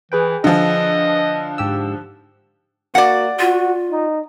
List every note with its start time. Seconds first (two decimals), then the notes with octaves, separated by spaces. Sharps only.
0.12 E3 G#4 B4 G5
0.44 D3 F3 D#5
1.58 G#2 G4 E6
2.95 A#3 F#4 D5 F#5
3.39 F4 F#4
3.91 D#4